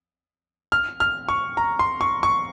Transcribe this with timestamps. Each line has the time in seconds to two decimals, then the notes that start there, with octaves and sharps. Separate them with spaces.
0.72 F6
1.00 F6
1.29 C#6
1.57 A#5
1.79 C6
2.01 C#6
2.23 C#6